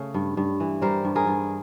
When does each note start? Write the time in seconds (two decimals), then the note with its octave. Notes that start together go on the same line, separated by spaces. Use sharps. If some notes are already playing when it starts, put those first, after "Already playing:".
Already playing: C#3 A3
0.14 G2
0.37 G2
0.60 E3
0.82 G3 A#4 C5
1.05 G2
1.16 G#4 A#4
1.27 G2